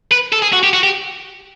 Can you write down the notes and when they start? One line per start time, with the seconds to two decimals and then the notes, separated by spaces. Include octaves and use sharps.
0.11 B4
0.32 A4
0.42 G#4
0.53 F#4
0.63 G4
0.74 F#4
0.83 G4